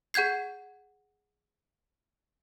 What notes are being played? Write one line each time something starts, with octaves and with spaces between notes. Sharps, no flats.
G#4 F#5 G6 G#6 C7